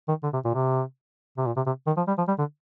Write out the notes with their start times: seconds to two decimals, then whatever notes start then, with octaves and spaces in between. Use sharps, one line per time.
0.08 D#3
0.23 D3
0.33 C3
0.44 A#2
0.54 C3
1.37 C3
1.46 A#2
1.56 C3
1.66 C3
1.87 D#3
1.97 F3
2.08 G3
2.18 F3
2.28 G3
2.39 D3